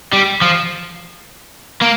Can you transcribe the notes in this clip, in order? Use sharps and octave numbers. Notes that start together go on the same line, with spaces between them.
G3
F3
A#3